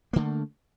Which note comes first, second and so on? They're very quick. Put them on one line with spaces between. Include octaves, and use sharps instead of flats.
A#3 D3 A3